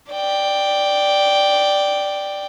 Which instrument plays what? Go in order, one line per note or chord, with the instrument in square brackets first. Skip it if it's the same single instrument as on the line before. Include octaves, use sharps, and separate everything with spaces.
[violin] D5 G5